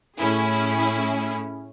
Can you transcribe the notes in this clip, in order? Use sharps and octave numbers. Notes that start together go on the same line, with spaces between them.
A2 C#4 E4 G#4